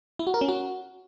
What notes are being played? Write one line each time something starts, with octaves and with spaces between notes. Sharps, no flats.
E4
F#4
A#4
C#4
F#4